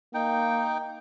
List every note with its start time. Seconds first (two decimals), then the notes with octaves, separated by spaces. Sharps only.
0.14 A#3 D#4 G5